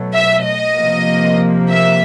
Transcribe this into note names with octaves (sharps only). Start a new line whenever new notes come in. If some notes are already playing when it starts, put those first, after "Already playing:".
Already playing: B2 F#3 A3
E5
D#5
C3 F3 A#3
E5